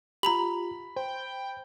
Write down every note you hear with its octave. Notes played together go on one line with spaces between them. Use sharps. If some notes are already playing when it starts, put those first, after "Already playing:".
F4 G4 A#5 B5 F7 F#7
C5 G5